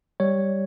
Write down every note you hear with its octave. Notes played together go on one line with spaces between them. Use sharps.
G3 C#5